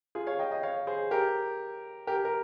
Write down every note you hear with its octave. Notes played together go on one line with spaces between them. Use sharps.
F4 G#4
C#5 F5
D#5 G5
D#5 G5
C#5 F5
G#4 C5
G4 A#4
G4 A#4
A#4